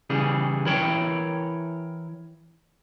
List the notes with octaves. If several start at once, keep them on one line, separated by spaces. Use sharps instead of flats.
C#3 E3 G3 G#4
E3 E4 A#4 C#5 G5